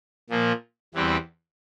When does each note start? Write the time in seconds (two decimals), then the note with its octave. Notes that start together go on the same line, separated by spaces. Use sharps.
0.30 A#2 F3 A#3
0.94 E2 E3 G3 C4 G4